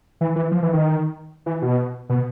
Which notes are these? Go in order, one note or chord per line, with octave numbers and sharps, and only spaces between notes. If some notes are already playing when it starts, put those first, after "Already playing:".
E3
E3
F3
E3
D#3
E3
B2
B2